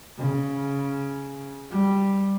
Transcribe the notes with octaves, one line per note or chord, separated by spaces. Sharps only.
C#3
G3